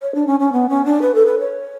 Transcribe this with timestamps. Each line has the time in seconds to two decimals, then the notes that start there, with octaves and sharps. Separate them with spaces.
0.02 C#5
0.15 D4
0.27 C#4
0.40 C#4
0.52 B3
0.69 C#4
0.85 D4
1.02 B4
1.15 A4
1.26 B4
1.39 C#5